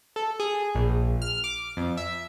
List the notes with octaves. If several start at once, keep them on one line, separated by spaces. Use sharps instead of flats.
A4
G#4
A#1
F6
D6
F2
E5